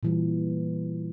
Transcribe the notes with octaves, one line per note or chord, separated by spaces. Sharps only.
A#2 E3 G3